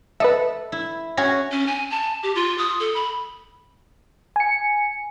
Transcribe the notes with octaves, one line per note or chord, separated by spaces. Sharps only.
A4 B4 D#5 E5
E4
C#4 F#4 G#4 A#6
C#4
G#5
A5
G4
F4
D#6
A4
B5
G#5 C#7